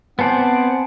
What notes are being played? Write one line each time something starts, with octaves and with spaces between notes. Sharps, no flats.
B3 C4 C5 D5 F#5 G#5 A5